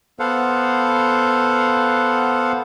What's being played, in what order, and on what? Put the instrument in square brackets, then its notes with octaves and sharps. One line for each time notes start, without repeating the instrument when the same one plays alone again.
[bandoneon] B3 A4 C5 F5 F#5